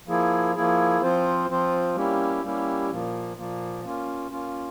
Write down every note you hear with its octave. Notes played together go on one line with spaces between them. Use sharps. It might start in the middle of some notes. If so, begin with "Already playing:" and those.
F3 A#3 E4 G#4
F3 A#3 E4 G#4
F3 C4 F4 C5
F3 C4 F4 C5
G3 A#3 C#4 E4 G4
G3 A#3 C#4 E4 G4
A#2 F3 A#3
A#2 F3 A#3
A#3 C#4 F4
A#3 C#4 F4